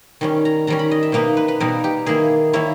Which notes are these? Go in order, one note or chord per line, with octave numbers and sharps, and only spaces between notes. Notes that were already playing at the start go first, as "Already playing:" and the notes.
D#3 G3 C#4
A#5
D#3 G3 C#4 A#5
B5
D#5
E5
B2 G3 A#3 D#4 B4
B4
B4
B2 G3 A#3 D#4 A#4
G4
D#3 A#3 E4 G#4
D#3 A#3 E4 C#5